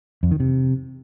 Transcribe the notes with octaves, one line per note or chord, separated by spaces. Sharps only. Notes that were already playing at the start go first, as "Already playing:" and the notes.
F2
D#3
C3